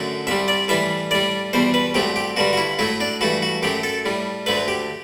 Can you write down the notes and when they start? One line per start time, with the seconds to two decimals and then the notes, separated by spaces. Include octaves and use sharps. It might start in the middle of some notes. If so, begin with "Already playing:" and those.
Already playing: F#2 D3 F#3 A3
0.27 C2 C3 G3 E5
0.48 D5
0.68 A2 E3 G3 E5
1.11 A2 G3 D5
1.53 E2 B2 G3 C5
1.74 B4
1.94 C2 C3 F#3 A3 G4
2.16 G4
2.36 G2 D3 G3 F#4
2.53 F#4
2.57 E4
2.79 A2 F#3 A3 E4
3.01 D4
3.21 G2 E3 A3 F#4
3.42 F#4
3.63 F#2 F#3 A3 G4
3.83 A4
4.06 A2 G3
4.46 D2 D3 F#3 A3 B4
4.68 G4